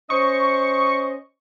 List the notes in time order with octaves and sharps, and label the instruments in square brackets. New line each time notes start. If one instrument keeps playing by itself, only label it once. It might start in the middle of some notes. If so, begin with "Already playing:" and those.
[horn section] C#4 C5 D#5 [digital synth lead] C#6